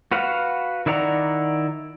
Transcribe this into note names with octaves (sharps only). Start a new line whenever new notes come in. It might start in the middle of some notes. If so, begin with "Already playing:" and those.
F#4 B4 F5 F#5
D#3 E4 D5 F#5 A#5